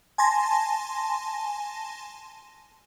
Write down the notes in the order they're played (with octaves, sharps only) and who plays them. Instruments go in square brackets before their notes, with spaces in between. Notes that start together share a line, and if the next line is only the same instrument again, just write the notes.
[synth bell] G#5 A5 C6 A#6